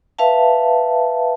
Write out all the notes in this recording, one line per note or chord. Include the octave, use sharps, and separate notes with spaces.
B4 E5 F5 A5